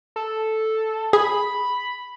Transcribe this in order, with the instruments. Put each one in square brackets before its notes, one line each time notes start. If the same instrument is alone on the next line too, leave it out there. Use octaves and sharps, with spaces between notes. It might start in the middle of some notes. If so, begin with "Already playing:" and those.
[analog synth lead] A4
[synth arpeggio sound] G#4 [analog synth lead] B5